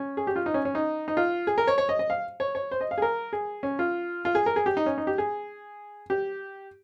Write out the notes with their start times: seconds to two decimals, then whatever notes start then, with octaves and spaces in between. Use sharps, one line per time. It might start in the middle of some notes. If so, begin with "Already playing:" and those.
Already playing: C#4
0.17 G#4
0.27 G4
0.36 F4
0.46 D#4
0.54 C#4
0.65 C#4
0.75 D#4
1.08 D#4
1.17 F4
1.47 G#4
1.58 A#4
1.67 C#5
1.78 C#5
1.89 D#5
1.99 D#5
2.10 F5
2.40 C#5
2.55 C#5
2.71 C5
2.81 D#5
2.91 F5
2.98 G#4
3.02 A#4
3.33 G#4
3.63 C#4
3.79 F4
4.25 F4
4.35 G#4
4.46 A#4
4.56 G#4
4.66 G4
4.77 D#4
4.86 C#4
4.98 D#4
5.07 G4
5.18 G#4
6.10 G4